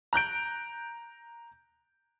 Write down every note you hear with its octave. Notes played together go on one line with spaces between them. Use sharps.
A#5 F#6 G6 D7